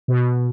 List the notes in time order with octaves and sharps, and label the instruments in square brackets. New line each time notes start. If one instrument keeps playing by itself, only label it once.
[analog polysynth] B2